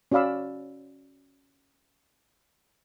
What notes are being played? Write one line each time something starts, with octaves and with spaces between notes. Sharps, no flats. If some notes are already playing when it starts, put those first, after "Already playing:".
C#4 F#4 D5 F5 B5 E6